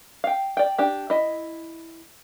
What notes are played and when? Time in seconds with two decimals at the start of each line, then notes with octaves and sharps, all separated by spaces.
0.24 F5 G5
0.57 D5 G5
0.78 D4 G4
1.10 E4 D#5